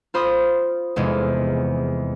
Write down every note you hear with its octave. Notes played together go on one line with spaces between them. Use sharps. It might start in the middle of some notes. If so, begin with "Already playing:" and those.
F4 C5 B5 D#6
F1 E2 G#3